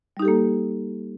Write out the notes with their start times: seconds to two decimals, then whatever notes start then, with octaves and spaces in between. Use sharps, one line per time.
0.17 G3
0.19 D#4
0.22 G4
0.25 A4
0.28 A#3